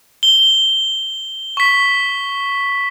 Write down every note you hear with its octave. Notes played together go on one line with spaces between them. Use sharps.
G7
C#6 B6